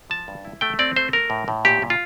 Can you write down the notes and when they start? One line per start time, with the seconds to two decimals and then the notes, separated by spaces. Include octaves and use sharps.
0.10 F3 A5
0.28 G2
0.45 E4
0.61 A3 G5
0.79 C4 D5
0.96 A3 C5
1.13 A3 A#4
1.30 A2
1.48 A2
1.65 A#2 G4
1.82 A#2
1.90 F4